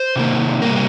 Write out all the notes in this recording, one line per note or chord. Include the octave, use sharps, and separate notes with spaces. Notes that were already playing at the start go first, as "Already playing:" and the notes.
Already playing: C5
C3 D#3 A#3
C3 G3 A#3 A#4